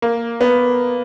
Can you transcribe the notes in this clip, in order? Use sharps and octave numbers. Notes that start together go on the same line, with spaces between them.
A#3
B3